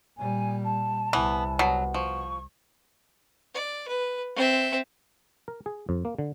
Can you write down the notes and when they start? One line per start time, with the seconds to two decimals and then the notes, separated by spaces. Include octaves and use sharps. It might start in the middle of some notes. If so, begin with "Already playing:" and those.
0.17 A#2 G3 G#5
0.64 A5
1.13 C2 E3 B3
1.59 B2 F#3
1.94 F3 C#6
3.54 D5
3.88 B4
4.36 C4 E5
5.48 A#4
5.66 G#4
5.89 F2
6.05 A#3
6.19 D3